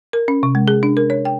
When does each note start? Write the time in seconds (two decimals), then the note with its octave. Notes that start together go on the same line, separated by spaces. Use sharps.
0.13 A#4
0.28 C#4
0.43 C3
0.55 G#3
0.68 G#4
0.83 D4
0.97 A#4
1.10 C#5
1.25 G5